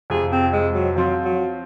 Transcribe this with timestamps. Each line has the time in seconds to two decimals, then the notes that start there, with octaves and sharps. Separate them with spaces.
0.10 F2 C3 F3 G#4
0.32 C4
0.52 G#3
0.75 F#3
0.96 F3 F#3 C4 F4
1.25 F#3